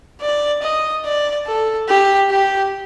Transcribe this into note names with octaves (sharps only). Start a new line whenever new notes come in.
D5
D#5
D5
A4
G4
G4